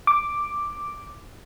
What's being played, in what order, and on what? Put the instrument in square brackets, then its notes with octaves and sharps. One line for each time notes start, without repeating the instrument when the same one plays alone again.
[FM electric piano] D6